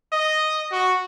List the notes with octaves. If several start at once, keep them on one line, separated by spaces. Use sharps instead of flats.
D#5
F#4